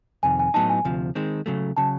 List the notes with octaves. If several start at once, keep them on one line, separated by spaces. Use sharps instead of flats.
F2 C3 D#3 G#5
G#5
A2 F#3 B3 D#4 A5
G#5
D2 C3 F3
D#3 G#3 C4
C#3 F#3 A3
C#3 F#3 A5